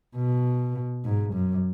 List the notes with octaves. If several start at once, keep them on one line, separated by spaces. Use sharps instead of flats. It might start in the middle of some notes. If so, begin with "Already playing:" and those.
B2
G#2
F#2